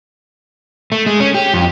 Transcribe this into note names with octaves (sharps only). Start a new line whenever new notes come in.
A3
G#3
C#4
G4
F2